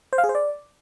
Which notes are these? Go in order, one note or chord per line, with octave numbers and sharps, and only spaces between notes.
C5
F5
G#4
C5
D5